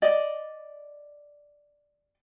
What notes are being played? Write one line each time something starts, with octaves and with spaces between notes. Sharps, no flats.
D5 D#5